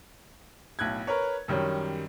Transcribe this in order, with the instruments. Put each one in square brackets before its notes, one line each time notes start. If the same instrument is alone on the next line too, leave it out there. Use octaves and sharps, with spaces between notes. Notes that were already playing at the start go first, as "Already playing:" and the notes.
[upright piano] B1 A2 F#6 G#6
A#4 B4 C#5
F#2 D#3 G3 C#4